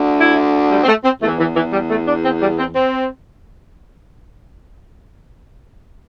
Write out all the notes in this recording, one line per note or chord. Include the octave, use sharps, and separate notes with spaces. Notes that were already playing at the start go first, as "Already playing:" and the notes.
Already playing: D2 D3
E4
G3
C4
A3
C4
E2 E3 A3
E3
E3
G3
A3
D4
C4
G3
C4
C4